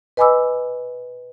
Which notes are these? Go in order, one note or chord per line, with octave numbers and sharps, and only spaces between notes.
B4 D#5 G#5 B5 D6 E6